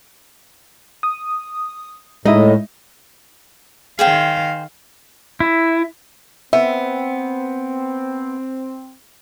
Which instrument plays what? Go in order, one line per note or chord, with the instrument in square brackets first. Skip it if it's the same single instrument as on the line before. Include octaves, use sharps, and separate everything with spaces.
[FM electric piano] D#6
[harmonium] A2 [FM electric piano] G#3 [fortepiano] D#4 E4 [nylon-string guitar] D#5
[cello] D#3 F5 [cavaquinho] G#4 C5 G5
[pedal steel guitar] E4
[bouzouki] B3 [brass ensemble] C4 [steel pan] E5